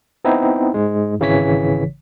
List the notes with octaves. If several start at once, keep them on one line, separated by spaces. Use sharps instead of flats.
B3 C4 D#4 E4
G#2 G#3
G#1 C#3 E3 C#5 B6